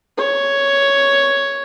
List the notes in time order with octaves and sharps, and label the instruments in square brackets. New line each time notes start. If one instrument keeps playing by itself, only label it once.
[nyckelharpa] C#5